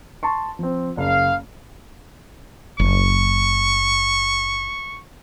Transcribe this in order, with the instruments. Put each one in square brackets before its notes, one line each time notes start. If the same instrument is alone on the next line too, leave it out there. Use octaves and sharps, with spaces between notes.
[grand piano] A5 C6 C#6
F3 C4
[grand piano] F#1 [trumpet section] F5
[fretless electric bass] F#1 [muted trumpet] C#6